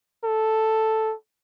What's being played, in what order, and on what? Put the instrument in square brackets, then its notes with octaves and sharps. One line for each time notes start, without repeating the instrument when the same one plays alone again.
[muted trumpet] A4